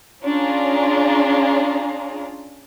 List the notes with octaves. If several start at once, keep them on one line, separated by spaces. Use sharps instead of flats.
C#4 D4 F4 G#4 A#5